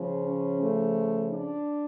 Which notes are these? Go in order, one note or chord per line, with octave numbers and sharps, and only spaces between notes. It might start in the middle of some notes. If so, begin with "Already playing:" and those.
Already playing: C#3 F3
C#4
A3
D4